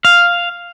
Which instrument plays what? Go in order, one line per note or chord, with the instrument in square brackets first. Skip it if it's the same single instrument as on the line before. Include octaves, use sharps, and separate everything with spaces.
[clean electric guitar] F5